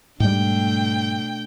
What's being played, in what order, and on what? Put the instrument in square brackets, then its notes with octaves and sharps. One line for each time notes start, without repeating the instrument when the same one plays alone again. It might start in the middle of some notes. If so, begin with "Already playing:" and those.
[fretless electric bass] G#2 G3 [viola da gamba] B2 A3 D4 [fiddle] G5